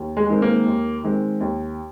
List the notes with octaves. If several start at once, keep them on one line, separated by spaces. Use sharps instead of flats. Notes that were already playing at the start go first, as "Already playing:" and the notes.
Already playing: D#2
G#3
D#3 G#3 C4
A#3
D#2
D#3 G#3 C4
D#2